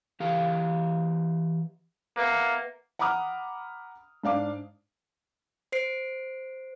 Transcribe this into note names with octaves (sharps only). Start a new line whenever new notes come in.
E3 G4 F5
A#3 B4 E5 F#5
F#5 A#5 B5 D6 D#6 F6
G#2 D4 F5 D6
C5 C7 D7